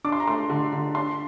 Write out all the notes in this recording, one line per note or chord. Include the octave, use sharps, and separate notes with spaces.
D4 D6
C6
A#5
A3 C6
D3
D3
D4 C6